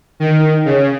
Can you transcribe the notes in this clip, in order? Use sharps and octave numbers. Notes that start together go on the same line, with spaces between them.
D#3
C#3